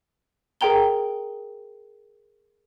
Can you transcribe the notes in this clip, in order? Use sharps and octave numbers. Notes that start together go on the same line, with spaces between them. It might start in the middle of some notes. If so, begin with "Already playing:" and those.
G#4 A#4 G5 A#5 G7